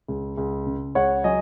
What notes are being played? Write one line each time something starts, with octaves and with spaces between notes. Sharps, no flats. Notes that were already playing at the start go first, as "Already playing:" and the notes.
C#2
C#2
C#3
C#2 C#5 F#5
F#3 D#5 G#5